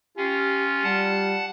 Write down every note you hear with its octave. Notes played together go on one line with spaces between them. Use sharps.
C#4 F4 G4
G3 F#5 A5